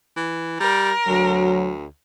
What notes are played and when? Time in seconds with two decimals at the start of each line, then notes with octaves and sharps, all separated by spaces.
0.16 E3
0.60 G3 A#4
1.08 D2 F#3